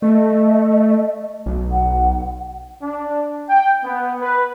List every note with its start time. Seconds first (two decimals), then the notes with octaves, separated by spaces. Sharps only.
0.02 A3 D#5
1.46 B1
1.72 F#5
2.82 D4
3.49 G5
3.84 B3
4.21 B4